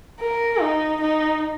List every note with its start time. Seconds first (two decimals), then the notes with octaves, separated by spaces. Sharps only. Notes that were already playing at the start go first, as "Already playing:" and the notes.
0.20 A#4
0.61 D#4
1.01 D#4